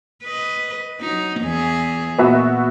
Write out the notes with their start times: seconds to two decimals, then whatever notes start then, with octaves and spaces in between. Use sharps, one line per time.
0.23 B4 D#5
1.00 F#3 D#4
1.41 E2 E3 G#4
2.18 A#2 B3 F#4 E5